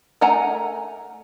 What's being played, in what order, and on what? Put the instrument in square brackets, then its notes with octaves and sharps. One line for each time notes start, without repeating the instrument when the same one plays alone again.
[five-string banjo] A3 A#4 F#5 G#5 A#5